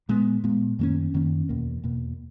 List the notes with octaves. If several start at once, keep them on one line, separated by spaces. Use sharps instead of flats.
A#2 G#3 B3
A#2 G#3 B3
F#2 D#3 A#3 C#4
F#2 D#3 A#3 C#4
E2 B2 A#3
E2 B2 A#3